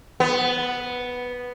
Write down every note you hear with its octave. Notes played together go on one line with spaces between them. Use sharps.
B3